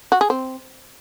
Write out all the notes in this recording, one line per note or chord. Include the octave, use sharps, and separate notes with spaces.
F#4
G#4
C4